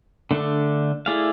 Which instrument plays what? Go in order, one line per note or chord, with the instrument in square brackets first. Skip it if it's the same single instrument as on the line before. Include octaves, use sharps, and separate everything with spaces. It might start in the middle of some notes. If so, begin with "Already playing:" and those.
[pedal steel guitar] D3 A3 D4
A3 E4 G#4 D5 F5